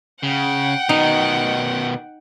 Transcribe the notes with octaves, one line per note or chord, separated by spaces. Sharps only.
C#3 F#5 G5
B2 D#3 D#4